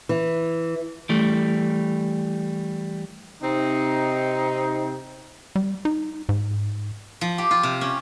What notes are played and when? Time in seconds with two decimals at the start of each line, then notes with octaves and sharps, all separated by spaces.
0.09 E3
1.09 E3 G3 A3
3.43 C3 C4 D#4
5.56 G3
5.85 D#4
6.29 G#2
7.21 F3
7.38 G4
7.51 F4
7.63 C3
7.81 C#4